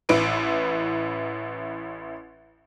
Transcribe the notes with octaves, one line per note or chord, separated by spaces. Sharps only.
A1 E4 B4 D7